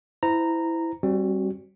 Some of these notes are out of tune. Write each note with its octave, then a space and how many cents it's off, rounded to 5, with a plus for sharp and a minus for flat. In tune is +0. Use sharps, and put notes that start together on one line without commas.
E4 +0 C5 -30 A#5 -10
G3 +0 C4 +40 F#4 +15